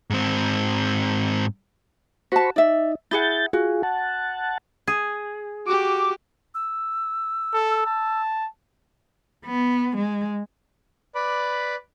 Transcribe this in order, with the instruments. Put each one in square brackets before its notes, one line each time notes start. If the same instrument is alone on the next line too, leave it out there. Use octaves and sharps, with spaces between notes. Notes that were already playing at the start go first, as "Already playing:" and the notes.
[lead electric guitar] G#2 C4
[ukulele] F#4 A5 [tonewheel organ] C5 B5 C#6
[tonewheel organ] D#4 [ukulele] D5 E5
[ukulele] E4 G#4 F#5 [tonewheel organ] G6 A6
[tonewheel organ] F4 G#4 [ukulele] F#4
[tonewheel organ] F#5 A5
[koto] G#4
[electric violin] F#4 G4 [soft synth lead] D6
[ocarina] E6
[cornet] A4
A5
[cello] B3
G#3
[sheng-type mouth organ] B4 D5 B5 D6